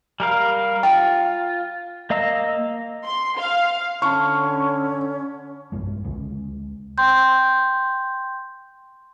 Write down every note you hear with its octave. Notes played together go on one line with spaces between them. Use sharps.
G3 A#4 F5
F4 G5
A#3 D#5 F5 A#5 E6
C6
F5
D3 C#4 A5 B5 C#6 F6
B1 G2 B2 G#3
D2 C#3 G#3
G5 C6 G6